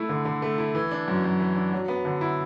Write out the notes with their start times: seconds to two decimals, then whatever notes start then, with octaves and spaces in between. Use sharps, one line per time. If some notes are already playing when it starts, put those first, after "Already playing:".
Already playing: A3 E4
0.09 D3
0.25 D3
0.42 A3
0.58 E4
0.75 E3
0.91 D4
1.08 F#2
1.24 F#2
1.40 E3
1.56 D4
1.73 F#3
1.88 B3
2.05 D3
2.21 E4